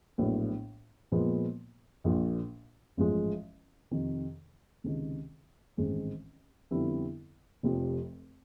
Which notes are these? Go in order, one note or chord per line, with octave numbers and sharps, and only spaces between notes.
A#1 A2 F#3 B3
A#2 F3 G#3 B3
A#1 A#2 F3
A1 G#2 F3 G#3
F2 C3 D#3
C#2 C3 D#3
A1 G#2 D#3 G#3 C4
F2 D3 G3 B3 E4
F1 F2 C3 F3